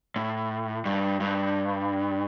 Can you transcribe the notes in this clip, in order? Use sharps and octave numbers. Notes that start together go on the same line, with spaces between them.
A2
G2
G2